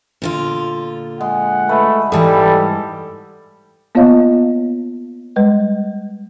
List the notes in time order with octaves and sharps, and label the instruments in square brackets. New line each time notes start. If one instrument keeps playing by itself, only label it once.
[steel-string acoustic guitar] A#2 D3 F4
[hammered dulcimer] G#3 [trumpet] F#5
[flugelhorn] A3 [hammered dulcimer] B4
[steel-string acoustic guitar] G#2 E3 F#5 [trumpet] G3 [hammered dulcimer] G#4 B5 [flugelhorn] A4
[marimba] A#3 B3 F4 C#5 D#5 F5
G3 G#3 B4 D#5